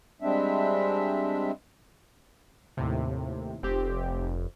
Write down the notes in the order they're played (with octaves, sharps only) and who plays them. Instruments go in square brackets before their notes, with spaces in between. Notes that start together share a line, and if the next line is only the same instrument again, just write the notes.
[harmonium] G3 G#3 C4 D4 E5
[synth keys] D#2 A2 C3
[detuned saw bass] F1 [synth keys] C4 G4